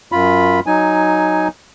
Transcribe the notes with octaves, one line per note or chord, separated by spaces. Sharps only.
F#2 F4 B5
F#3 D#4 G#5